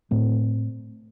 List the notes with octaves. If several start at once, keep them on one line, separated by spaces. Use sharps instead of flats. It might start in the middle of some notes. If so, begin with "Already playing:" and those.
A2 A3 C4